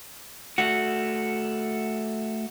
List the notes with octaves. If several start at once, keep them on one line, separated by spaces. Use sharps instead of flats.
A3 F#4